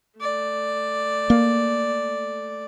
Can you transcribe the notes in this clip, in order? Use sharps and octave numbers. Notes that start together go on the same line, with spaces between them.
A3 D5
A#3